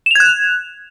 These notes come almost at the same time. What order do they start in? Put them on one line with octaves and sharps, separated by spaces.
E7 F7 G#6 F#6